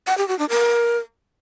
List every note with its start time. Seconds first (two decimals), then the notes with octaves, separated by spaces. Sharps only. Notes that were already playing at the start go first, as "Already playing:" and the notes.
0.07 F#5
0.18 G4
0.28 F#4
0.39 D4
0.49 A#4